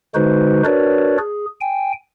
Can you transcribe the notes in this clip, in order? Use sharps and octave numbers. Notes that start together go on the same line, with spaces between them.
D3 G#3 D#4 F#4 B4 C5
D4 F#4 A#4 B4 C#5 D5
G#4
G5 G#5